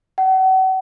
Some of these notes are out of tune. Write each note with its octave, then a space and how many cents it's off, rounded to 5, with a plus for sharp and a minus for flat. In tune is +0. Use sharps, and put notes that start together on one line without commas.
F#5 +35